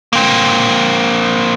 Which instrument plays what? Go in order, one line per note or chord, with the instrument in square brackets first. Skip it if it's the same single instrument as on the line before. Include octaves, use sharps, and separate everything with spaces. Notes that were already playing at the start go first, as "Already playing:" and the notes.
[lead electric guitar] A#3 C4